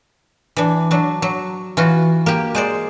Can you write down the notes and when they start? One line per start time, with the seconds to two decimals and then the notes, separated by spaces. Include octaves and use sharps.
0.57 E3 D4
0.91 F#3 D4
1.22 F#3
1.77 E3 F4 F#4
2.26 A#3 G4
2.55 G#3 C5 D5